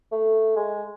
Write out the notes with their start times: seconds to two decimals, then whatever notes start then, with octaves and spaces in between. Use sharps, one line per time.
0.12 A3
0.56 G#3